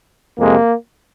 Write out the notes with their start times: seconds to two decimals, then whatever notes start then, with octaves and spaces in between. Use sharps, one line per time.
0.38 F2 C3 G#3 A#3